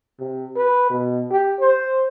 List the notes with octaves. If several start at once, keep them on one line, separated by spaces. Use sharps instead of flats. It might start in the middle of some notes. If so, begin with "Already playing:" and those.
C3
B4
B2
G4
C5